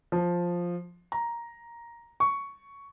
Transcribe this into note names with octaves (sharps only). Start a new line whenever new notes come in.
F3
A#5
C#6